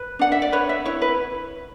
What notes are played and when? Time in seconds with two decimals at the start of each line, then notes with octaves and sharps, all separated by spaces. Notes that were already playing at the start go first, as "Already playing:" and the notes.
Already playing: B4
0.19 D4 F#5
0.32 E5
0.42 D5
0.52 B4 C#5
0.69 E5
0.85 E4 C#5
1.02 B4